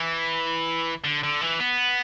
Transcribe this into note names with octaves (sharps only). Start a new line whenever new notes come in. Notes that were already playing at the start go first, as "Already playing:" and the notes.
Already playing: E3
D3
D3
E3
B3